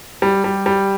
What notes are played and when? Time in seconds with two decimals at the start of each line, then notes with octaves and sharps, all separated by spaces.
0.22 G3
0.44 G3
0.66 G3